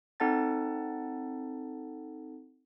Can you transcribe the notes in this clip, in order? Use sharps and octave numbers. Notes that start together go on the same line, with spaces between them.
C4 D#4 A4 F#5 A5 A6